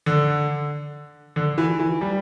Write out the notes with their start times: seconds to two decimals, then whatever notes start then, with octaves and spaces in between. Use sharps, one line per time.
0.06 D3
1.36 D3
1.58 E3
1.79 E3
2.01 G3